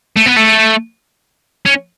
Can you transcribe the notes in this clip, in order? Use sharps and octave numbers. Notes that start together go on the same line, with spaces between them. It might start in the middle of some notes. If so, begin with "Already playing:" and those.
A3
B3
A3
C#4